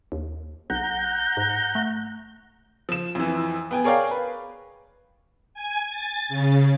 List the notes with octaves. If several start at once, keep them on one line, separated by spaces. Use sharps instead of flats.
D#2
B1 F#5 A#5 G6
G#2
A3
F3 E7
F2 E3
B3 G5 G#5
G#4 A#4 C#5 D5 F5 G5
B4
G#5
A6
C#3